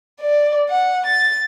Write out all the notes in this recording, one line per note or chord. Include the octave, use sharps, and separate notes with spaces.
D5
F#5
A6